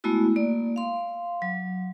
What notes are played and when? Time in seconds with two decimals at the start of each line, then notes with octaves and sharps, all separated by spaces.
0.04 G#3 A3 B3 E4 F#4
0.36 A#3 D5
0.76 F5 C6
1.42 F#3